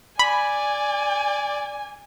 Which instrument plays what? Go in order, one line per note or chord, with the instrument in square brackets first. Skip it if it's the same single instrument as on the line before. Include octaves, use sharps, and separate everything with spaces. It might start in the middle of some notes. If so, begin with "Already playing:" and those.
[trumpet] D5 [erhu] G#5 [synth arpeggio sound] B5